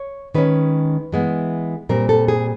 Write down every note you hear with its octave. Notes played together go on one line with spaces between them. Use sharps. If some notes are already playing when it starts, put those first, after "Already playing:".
Already playing: C#5
D#3 G#3 C#4 B4
E3 G#3 B3
A#2 G3 C4 A#4
A4
G#4